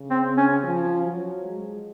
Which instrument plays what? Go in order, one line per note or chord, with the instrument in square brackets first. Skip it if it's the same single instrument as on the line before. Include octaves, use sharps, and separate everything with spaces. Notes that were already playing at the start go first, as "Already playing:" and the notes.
Already playing: [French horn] C#3
[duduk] C4
C#4
[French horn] F3
F#3
G#3